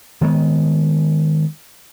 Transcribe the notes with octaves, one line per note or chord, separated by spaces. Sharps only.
D#3 G#3 B3